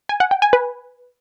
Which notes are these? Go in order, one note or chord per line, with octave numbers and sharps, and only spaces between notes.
G#5
F#5
G5
G#5
B4